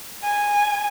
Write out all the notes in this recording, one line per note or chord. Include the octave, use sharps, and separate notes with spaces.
G#5